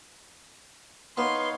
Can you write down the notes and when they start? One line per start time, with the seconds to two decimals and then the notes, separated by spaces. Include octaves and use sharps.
1.17 B3 D#4 C#5 F5 C6